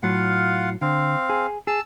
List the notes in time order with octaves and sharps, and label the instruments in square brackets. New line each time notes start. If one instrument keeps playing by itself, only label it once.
[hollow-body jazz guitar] A2 F#3 [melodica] F4 F5 F#5
[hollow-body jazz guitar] D3 [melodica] C4 F5
[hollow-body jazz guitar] G#4
[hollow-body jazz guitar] G#4 [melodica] A5 E6